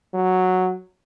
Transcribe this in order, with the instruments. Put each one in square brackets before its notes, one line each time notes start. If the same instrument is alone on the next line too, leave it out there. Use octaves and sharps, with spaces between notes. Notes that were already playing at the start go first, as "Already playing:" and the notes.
[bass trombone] F#3